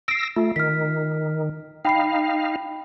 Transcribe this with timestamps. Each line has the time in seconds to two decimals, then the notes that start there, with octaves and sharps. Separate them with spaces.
0.08 E6 A#6 C7 D7
0.36 A3 F4
0.56 D#3 F6 B6
1.85 D#4 F5 G5 B5 C7